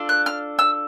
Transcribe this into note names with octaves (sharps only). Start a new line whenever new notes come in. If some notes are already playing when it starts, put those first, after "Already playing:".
Already playing: D4 F4 A4
F#6
F6
E6